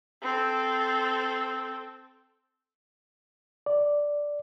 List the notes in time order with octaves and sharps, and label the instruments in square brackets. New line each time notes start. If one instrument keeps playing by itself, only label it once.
[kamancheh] C4 A4
[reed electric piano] D5